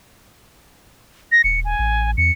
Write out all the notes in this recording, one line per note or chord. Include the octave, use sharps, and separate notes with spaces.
A#6
D#1 C#7
G#5
A1
E2 C#7